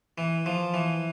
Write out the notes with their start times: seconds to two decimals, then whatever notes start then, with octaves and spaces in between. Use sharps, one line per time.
0.18 E3
0.46 F3
0.74 E3